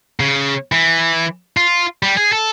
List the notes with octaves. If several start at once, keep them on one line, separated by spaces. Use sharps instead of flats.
C#3
E3
F4
G3
G#4
A4